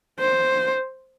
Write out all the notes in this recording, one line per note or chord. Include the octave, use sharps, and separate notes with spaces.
C5